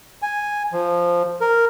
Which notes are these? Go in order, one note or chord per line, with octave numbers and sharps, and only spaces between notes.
G#5
F3
A#4